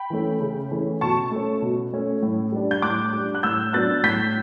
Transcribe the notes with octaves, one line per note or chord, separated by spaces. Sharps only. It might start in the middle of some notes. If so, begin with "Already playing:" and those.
Already playing: G5 B5
E3 A3 C#4
C#3
E3 A3 C#4
B2 A5 C#6
A3 C#4
B2
A3 C#4
A2
G3 D4
G6
A2 D6 F#6
G3 D4
F#6
A2 E6 G6
F#3 B3 D4 F#6 A6
A2 G6 B6